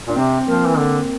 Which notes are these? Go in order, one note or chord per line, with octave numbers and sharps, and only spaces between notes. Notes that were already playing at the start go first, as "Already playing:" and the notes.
A#2 D4
C3 C4
F3 A#3
E3
D3